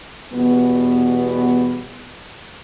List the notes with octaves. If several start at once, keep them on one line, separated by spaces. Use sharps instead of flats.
E2 B2 G3 B3